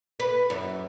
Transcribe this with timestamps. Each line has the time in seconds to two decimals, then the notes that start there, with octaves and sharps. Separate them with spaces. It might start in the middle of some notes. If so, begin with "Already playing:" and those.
0.20 B4
0.50 F#2